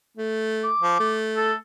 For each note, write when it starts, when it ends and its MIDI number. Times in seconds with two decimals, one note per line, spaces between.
0.17 0.70 57
0.64 1.13 86
0.81 0.97 53
1.00 1.55 57
1.37 1.54 69